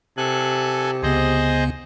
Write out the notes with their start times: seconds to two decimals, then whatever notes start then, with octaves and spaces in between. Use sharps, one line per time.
0.17 C3 A4 G#5 F#6
1.03 C#2 C#3 B3 G#4 C5 D#5